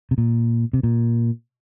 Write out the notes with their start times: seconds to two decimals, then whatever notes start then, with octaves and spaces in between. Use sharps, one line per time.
0.11 C3
0.18 A#2
0.73 C3
0.83 A#2